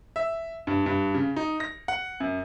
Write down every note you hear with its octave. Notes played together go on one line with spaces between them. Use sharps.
E5
G2
G2
C#3
D#4
A#6
F#5
F#2